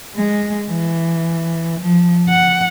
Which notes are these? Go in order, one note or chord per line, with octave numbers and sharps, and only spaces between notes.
G#3
E3
F3
F#5